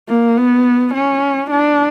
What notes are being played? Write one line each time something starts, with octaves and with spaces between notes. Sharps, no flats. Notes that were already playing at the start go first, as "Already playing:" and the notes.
A#3
B3
C#4
D4